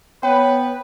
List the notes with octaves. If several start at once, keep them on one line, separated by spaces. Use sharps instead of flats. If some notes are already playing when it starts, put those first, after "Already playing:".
B3 B4 C#5 G5